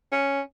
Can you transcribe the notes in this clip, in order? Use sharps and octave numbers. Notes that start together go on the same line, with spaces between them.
C#4